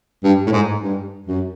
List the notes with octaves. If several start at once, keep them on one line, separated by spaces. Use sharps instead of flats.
G2
A2
G#2
G2
F#2